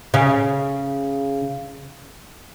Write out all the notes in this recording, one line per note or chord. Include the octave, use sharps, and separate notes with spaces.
C#3